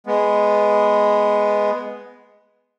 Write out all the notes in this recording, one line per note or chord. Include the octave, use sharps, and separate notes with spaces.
G#3 B3